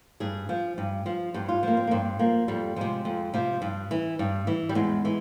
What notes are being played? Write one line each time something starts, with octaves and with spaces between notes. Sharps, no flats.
G2 G#4
F3
G2
F3
G2 G4
F4
F3 A#3
C4
A#3
G2 C4
F3 A#3
F2 G3
C3 F3 G#3
F2
C3 F3
G2
E3
G2
E3
G3
E2 G#3
E3